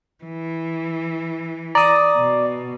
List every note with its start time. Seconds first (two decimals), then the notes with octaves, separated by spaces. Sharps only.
0.24 E3
1.75 D5 A#5 D#6
2.17 B2